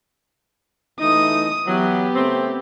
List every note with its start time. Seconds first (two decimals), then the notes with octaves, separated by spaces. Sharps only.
1.00 E3 A3 D#4 D#6
1.66 E3 F#3 B3 G4
2.15 C#3 A3 C4